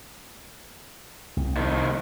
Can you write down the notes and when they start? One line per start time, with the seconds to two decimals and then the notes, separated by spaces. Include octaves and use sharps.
1.37 C2
1.57 F2 D#3